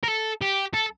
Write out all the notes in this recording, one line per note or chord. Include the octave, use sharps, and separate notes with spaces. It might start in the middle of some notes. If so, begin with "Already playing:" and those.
A#4
A4
G4
A4